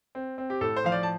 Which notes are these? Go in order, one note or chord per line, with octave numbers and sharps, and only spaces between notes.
C4
C4
G4
A2 A4
C5
F3 F5
D5
A5